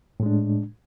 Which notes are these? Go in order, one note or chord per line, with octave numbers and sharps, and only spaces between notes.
A2 G#3 D4